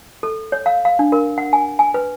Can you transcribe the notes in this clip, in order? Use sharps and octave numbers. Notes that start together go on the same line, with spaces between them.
A4
C#5
F5
F5
D4
A#4
F#5
G#5
G#5
B4